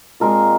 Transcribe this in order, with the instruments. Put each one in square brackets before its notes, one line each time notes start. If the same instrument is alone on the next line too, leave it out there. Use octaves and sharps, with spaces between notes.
[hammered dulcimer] A#2 G#3 C4 A#4